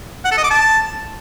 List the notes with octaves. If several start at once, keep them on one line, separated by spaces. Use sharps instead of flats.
F#5
A4
D#5
D6
A5